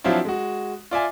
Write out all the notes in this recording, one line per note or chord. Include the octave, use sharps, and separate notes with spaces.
F3 F#3 C4 D4 E4 F4
G#3 F#4
F4 D5 E5 G#5